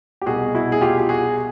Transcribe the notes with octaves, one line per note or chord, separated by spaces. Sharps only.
G4
C2 B2 F#4 G#4
E4 F#4
G#4
F4 G4
G4
F#4 G#4